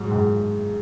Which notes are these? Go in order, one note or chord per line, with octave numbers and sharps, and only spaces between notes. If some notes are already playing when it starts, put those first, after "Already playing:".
Already playing: G#2 F#3
G#2